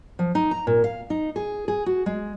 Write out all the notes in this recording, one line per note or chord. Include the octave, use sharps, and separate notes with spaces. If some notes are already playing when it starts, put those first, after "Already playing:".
F3
D#4
A#5
A#2
F5
D#4
G#4
G#4
F#4
G#3